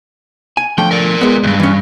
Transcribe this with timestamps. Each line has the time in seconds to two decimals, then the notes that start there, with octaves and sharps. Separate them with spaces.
0.57 G#5
0.78 D3 F3 A3 G5
0.91 A#4 D5
1.21 G#3 B3
1.43 C#2 G2
1.59 E3 C#4